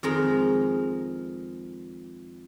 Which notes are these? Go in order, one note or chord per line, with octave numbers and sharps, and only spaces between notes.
F2 D#3 G#3 A#4